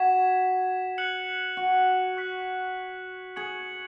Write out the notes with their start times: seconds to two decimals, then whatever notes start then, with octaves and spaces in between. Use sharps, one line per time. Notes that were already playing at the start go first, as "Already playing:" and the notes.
Already playing: F#4 G#6 B6 E7
0.98 F#6 C#7 F#7
1.57 F#4
2.17 C#6 F#6 B6
3.36 G#4 C#6 G#6 C#7 F#7